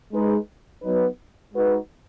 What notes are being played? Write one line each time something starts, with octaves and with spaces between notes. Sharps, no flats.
G#3 D#4 B4
F#3 B3 D#4 B4
G#3 D#4 F#4 B4